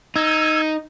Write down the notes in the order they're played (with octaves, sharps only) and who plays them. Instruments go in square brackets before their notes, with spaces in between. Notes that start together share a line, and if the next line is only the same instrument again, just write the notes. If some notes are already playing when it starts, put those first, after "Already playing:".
[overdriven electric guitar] D#4 [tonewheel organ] E6 G#6